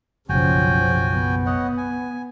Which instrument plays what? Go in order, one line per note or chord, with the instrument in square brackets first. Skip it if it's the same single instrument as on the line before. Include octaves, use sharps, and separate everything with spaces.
[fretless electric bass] F#1 B1 [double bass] C#3 F3 [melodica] F#4 G5 G#5
[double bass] B3
[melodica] C#5 D#5 F#5
G#5